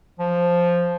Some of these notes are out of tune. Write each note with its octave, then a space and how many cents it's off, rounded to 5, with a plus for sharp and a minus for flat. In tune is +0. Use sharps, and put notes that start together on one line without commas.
F3 +0